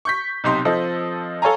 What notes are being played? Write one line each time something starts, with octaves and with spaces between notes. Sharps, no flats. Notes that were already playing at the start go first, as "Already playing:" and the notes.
C#6 G6 B6
B1 C3 D#4 G4 C6
F3 C4 A4 D#5
A4 C#5 F5 G#5 A#5